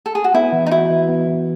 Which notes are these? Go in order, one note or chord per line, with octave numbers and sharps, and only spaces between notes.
A4
G#4
F#4
B3 E4
E3
D#4
E4 F#4
E3
B3
E3